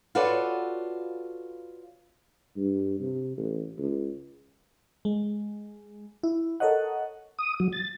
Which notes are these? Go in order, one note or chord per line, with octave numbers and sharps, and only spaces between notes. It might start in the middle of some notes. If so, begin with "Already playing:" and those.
F4 F#4 A4 B4 C#5 D5
G2
C3
A1
C#2
G#3
E4
A4 A#4 C#5 D#5 F#5
D#6
F#3
A6